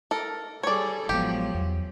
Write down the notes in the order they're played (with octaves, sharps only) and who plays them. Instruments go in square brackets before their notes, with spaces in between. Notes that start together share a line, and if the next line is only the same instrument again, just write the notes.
[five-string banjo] A4 A#4
[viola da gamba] G3 G#4 A4 [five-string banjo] C#5 D5
[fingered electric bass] A1 G#3 B3 [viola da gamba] F3 F#3 [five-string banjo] G4
[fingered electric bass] E2